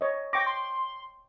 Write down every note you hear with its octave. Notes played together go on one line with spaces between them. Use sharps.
C#5 D#5
G5 C#6 D6 A#6
C6